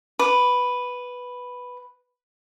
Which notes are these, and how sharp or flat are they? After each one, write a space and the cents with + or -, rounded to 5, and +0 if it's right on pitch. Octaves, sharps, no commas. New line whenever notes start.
B4 +0 D6 -5